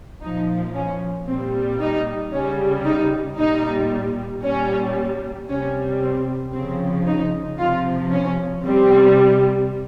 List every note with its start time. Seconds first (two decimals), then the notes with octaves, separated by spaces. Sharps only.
0.22 A#2 F3 D#4
0.75 C#4
1.27 A#2 G3 C4
1.80 D#4
2.32 C#3 G3 C#4
2.85 D#4
3.38 A#2 G3 D#4
4.43 A#2 G3 C#4
5.48 C3 G3 C#4
6.00 C4
6.53 C#3 F3 C4
7.06 D#4
7.59 C3 F3 F4
8.11 C#4
8.64 C3 G3 C4